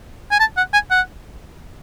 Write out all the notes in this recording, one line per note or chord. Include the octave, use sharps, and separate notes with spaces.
G#5
A5
F#5
G#5
F#5